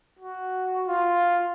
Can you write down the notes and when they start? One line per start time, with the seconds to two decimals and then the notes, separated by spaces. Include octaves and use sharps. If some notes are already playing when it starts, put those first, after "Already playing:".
0.19 F#4
0.87 F4